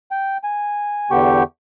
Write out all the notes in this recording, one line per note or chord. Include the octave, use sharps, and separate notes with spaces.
G5
G#5
E2 D3 B3 G4 G5 C#6